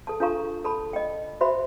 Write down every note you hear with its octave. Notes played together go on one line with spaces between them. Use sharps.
A4 A5
D4 F4 A4 F5 A#5 C#6
A4 A5 B5
D#5 G5
F#4 C5 E5 B5